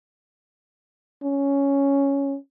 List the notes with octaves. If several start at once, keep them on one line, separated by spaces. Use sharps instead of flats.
C#4